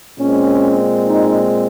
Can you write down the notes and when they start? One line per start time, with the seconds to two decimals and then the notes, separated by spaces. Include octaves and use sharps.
0.19 A#2 G#3 C4 C#4
1.08 D#4